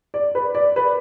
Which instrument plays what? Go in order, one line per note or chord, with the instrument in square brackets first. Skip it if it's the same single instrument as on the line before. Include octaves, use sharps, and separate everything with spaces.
[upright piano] D5
B4
D5
B4